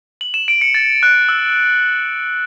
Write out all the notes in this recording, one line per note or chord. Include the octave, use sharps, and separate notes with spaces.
F#7
E7
D7
C#7
A6
F#6
E6